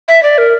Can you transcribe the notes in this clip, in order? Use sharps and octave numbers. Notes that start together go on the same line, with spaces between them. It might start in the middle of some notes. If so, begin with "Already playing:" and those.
E5
D5
A#4